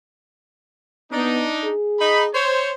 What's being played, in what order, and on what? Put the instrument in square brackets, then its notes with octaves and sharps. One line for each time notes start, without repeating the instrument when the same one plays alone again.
[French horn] B3 [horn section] D4 D#4
[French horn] G#4
[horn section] D#4 B5
C5 C#5